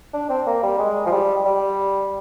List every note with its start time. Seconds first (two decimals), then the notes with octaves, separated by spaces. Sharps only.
0.13 D4
0.30 C4
0.47 A#3
0.63 G3
0.79 G#3
1.06 F3
1.12 G3
1.45 G3